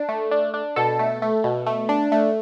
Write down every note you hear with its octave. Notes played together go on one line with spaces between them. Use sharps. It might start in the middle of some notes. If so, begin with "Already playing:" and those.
Already playing: D4
A3
D4
D4
B2 A4
A3
A3
B2
A3
D4
A3